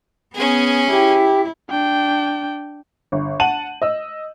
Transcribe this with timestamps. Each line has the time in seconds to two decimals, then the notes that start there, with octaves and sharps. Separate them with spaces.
0.35 B3 C#4 G#4
0.90 E4 G4
1.70 D4 G5
3.12 G1
3.40 F#5 A5 D#7 F#7
3.82 D#5 E6